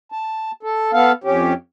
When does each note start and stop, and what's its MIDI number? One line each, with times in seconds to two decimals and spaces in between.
0.12 0.51 81
0.63 0.92 69
0.93 1.12 59
0.93 1.12 69
0.93 1.12 77
1.24 1.53 41
1.24 1.53 61
1.24 1.53 67